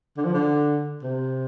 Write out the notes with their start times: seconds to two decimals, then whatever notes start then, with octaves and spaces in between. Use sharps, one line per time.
0.17 D3
0.25 F3
0.33 D3
1.03 C3